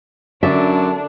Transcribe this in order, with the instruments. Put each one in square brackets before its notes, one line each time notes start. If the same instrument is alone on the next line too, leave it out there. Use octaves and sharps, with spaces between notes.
[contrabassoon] F#2 [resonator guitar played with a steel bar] D3 [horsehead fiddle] D4 [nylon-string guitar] E5